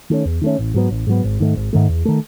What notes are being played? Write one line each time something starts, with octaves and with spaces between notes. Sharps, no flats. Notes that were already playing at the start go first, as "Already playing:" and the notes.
D#3 A3 C#4
E2
D#3 A3 C#4
A1
G#2 F#3 B3
A1
G#2 F#3 B3
G#1
G#2 D#3 A3
G#1
G#2 D#3 A3
E2
D#3 A3